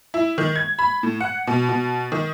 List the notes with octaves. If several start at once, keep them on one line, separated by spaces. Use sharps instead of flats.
E4
D#3
G#6
B5
A2
F#5
B2
B2
D#3